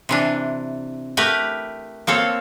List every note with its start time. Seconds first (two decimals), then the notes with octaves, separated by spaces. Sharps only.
0.09 C3 E3 D4
1.17 A3 G4 A#4 B4
2.07 A#3 C4 A4 C#5